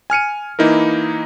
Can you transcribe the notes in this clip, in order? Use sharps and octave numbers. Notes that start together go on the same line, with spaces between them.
G#5 F6 C#7 D#7
E3 A#3 D#4 E4 A#4